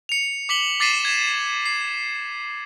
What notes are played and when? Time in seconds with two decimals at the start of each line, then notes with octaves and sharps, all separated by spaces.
0.09 C#7 F7
0.49 D6 B6 F#7 G7
0.80 D6 A6 B6 C7 D#7 E7
1.05 G#6 E7
1.66 C7